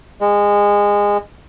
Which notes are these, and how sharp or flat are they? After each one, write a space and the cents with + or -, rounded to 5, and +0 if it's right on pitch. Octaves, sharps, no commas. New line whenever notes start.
G#3 -20